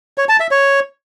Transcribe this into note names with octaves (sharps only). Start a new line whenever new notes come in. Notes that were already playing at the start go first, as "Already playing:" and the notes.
C#5
A5
E5
C#5